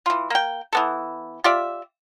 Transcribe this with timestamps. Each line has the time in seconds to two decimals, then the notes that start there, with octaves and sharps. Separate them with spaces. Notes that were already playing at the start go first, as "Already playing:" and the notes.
0.06 E3 F4
0.30 A#3 G5
0.73 E3 B3 A4
1.44 F4 G4 D5 E5